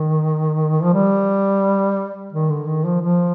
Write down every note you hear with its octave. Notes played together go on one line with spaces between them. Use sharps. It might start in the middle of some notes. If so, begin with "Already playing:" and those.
Already playing: D#3
F3
G3
D#3
D3
D#3
F3
F3